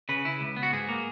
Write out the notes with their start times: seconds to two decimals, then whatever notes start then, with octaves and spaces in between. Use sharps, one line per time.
0.09 C#3 B4
0.25 E4
0.41 C#2
0.56 B3
0.63 F#4
0.73 G#2 G#4
0.89 A#3